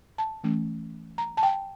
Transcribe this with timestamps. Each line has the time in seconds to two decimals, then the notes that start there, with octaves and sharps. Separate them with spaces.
0.18 A5
0.44 E3 A3 C#4
1.18 A#5
1.37 A5
1.43 G5